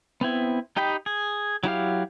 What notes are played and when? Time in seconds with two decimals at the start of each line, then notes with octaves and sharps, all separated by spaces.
0.21 B3 C4 E4
0.76 D#4 G4 D#5 G5 B5
1.06 G#4
1.64 F#3 E4 G4 F5